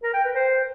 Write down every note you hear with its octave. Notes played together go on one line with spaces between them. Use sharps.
A#4
G5
B4
C5